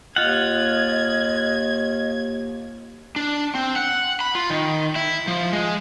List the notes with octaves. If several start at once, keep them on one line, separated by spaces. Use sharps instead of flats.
D#2 F4 D#5 F#5 G#6
D4
C4
F#5
B5
F4
D#3
E4
F3
G#3